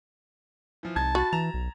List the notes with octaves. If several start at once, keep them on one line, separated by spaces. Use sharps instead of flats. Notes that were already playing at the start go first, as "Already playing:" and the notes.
E3 F3
C2 D#4 A5 G#6
F#4 B5 A6
E3 A#5 E7 F7
B1